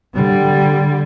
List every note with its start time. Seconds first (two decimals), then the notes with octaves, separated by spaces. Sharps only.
0.14 D3 G3